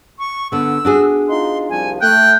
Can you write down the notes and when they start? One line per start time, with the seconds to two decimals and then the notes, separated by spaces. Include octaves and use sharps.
0.19 C#6
0.52 D3 B3 E6
0.85 D4 F#4 G#4
1.29 D#4 F4 C6
1.70 C2 F3 G#5
2.01 A3 G5 F#6